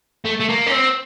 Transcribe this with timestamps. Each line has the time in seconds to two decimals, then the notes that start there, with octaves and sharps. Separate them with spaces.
0.25 A3
0.40 A3
0.49 A#3
0.66 C#4
0.71 C4